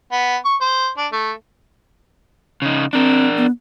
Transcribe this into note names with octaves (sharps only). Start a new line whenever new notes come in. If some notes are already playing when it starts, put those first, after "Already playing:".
B3
C#6
C5
D4
A3
C#3 D#4
C4 D4 A#4
B3